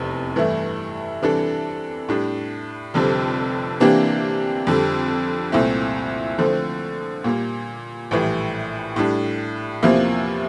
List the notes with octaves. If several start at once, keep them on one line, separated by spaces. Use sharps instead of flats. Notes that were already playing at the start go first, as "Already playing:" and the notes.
Already playing: F1 E2 C3
G2 E3 A3 E4
C3 E3 G3 D4 A4
A2 G3 D4
F1 F2 D3 G3 C4
C3 E3 A#3 D4 G4
F2 D3 G3
C2 A#2 A3 C4 E4
D3 F3 A3 C4
A#2 G3 A#3
A#1 A2 E3 G3
A2 G3 D4
E2 C3 F3 A#3 E4